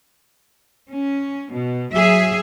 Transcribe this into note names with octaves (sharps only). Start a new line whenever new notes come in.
C#4
B2
F#3 G#4 E5